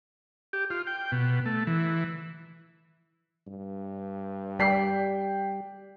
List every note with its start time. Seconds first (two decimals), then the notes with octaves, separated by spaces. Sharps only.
0.53 G4
0.70 F4
0.87 G5
1.12 B2
1.46 A3
1.67 E3
3.47 G2
4.59 G3 D5 G5 B6 C7